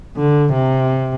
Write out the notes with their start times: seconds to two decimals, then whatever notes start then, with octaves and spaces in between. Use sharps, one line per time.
0.16 D3
0.53 C3